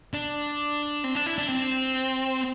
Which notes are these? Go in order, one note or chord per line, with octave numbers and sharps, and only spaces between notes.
D4
C4
D4
E4
D4
C4